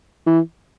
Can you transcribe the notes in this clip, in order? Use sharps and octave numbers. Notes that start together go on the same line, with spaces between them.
E3